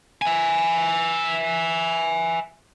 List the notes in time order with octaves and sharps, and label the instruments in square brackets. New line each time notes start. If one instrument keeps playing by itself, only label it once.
[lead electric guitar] E5 G#5